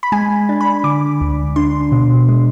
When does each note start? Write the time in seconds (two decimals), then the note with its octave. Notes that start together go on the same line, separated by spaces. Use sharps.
0.03 B5
0.12 G#3 G#5
0.49 D4
0.61 B5
0.84 D3 D6
1.21 D2
1.56 D4 C6
1.92 B2
2.28 G#3